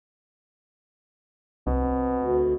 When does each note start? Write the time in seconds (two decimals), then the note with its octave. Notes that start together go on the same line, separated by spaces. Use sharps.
1.67 C2 B2 C4
2.16 D2